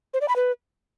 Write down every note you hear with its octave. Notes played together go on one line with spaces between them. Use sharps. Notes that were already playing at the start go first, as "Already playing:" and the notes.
C5
D5
B5
B4